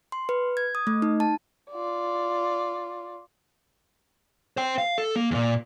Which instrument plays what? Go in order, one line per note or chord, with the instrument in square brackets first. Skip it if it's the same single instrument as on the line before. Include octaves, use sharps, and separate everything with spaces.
[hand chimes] C6
B4
G#6
D#6
A3
D#4
A5
[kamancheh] F4 D5
[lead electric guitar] C5 G5
F5
A4
A#3
E2 A#2